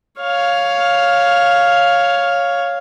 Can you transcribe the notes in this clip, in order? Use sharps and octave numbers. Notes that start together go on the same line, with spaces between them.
C#5 F5